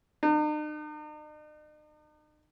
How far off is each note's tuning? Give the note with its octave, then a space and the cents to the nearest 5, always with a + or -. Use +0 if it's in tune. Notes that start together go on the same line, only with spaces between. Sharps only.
D#4 -45